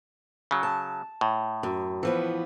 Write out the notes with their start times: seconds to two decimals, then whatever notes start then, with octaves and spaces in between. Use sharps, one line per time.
0.51 C#3 F#3
0.63 A5
1.21 A2
1.63 F#2
2.03 E3 F3 B3